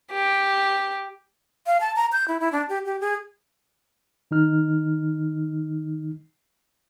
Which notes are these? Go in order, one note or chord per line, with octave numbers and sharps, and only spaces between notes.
G4
F5
A5
A#5
G6
E4
E4
D4
G4
G4
G#4
D#3 D#4 F6